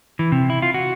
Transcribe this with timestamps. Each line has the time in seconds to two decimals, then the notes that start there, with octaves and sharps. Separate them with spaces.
0.19 E3
0.32 C3
0.50 E4
0.62 F4
0.74 F#4